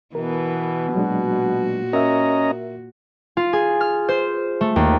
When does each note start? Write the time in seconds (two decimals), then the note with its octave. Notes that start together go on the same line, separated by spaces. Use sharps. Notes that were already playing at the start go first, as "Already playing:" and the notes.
0.15 B2 E3 B3 A#4
0.95 A#2 F#3 G#3 D4 F#4
1.93 C#4 A#4 D#5 E5 A#5
3.37 F4
3.53 G#4
3.81 F6
4.09 C5
4.61 A3
4.76 D#2